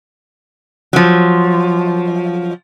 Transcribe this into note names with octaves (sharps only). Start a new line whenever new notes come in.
F3 F#3